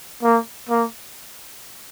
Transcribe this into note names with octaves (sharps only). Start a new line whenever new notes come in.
A#3
A#3